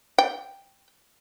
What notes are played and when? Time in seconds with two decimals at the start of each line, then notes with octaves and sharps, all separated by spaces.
0.18 G5